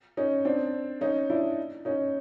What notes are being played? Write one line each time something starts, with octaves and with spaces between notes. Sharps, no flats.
C#4 D#4
C4 D4
C#4 D#4
D4 E4
C#4 D#4